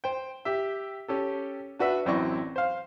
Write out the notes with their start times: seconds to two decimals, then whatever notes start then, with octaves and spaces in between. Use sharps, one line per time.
0.04 C5 G5
0.45 G4 E5
1.08 C#4 G4 A4
1.79 D4 F#4 B4 E5
2.06 A1 F#2 C4 E4 D5 C#6
2.56 C5 F5